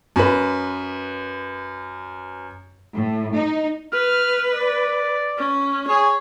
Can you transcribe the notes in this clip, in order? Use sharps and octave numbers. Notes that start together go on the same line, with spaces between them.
F#2 B4
A2
D#4
B4 F6
D5
C#4
G#4 C#5